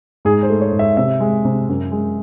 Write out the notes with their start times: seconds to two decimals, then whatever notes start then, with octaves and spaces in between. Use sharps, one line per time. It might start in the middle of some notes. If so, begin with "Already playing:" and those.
0.25 G#2 G#4
0.43 C5
0.50 A3
0.61 C#5
0.72 G#2
0.79 E5
0.97 C3 E5
1.20 G#3
1.45 C3
1.69 F#2
1.92 G#3